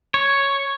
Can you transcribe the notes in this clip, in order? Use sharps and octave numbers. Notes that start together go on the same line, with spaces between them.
C#5